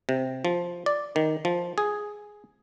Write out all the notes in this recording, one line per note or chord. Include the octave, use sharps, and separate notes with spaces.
C3
F3
D5
D#3
F3
G#4